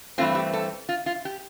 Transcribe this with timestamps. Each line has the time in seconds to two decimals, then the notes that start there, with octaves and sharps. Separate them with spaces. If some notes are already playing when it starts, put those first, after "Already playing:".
0.18 G2 E3 A3 C4 F4
0.35 G4
0.53 A4
0.89 F4
1.06 F4
1.25 G4